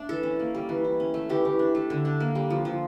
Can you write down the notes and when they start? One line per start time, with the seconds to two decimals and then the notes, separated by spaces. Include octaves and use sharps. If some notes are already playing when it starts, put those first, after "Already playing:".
Already playing: A3 D4
0.09 E3 A4
0.23 C#4
0.39 A#3
0.55 G3
0.69 E3
0.84 E4
1.00 C#4
1.14 A3
1.29 E3 G4
1.45 E3
1.59 D4
1.75 A3
1.90 D3
2.05 D4
2.20 A#3
2.35 G3
2.50 F3
2.65 F3